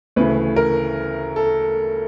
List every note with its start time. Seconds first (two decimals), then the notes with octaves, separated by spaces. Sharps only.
0.16 D2 C#3 E3 A3 B4
0.56 A#4
1.36 A4